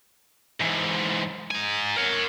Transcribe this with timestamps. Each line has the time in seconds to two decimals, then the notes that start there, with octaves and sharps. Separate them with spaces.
0.60 G#2 E3
1.51 D#4 G#5
1.97 A#4 C#5